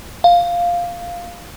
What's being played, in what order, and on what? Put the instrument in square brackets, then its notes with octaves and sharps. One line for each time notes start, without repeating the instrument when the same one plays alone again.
[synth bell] F5